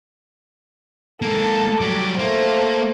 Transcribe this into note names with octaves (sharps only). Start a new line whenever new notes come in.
G#3 A#3 A4 A5
F#3 G3 D6
A3 A#3 C5